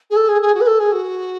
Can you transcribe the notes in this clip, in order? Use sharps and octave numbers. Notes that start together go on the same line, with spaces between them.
G#4
A4
G#4
G#4
F#4
B4
A4
G#4
F#4